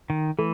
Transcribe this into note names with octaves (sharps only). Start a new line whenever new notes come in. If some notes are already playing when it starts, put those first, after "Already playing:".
D#3
E3 A3